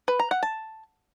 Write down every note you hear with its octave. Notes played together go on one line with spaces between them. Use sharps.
B4
A#5
F#5
A5